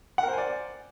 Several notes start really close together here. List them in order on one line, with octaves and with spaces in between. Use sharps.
F#5 A#4 C5 G#5 D5